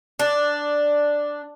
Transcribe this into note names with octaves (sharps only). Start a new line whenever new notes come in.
D4